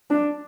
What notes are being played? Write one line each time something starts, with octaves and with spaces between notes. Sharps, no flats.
D4